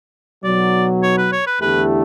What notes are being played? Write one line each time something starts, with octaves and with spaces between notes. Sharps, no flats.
B1 B2 F#3 D5
C#5
B4
C#5
B4
E2 D3 A3 E4 G4 B4